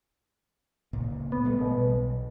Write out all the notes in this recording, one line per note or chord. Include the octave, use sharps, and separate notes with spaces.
C#2 A#2
B3
A1 G3 A3
B2
B1